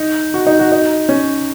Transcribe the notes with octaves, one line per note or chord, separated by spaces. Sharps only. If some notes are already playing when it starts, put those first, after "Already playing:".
Already playing: D#4
F#4
D#4
F#4
D#4
C#4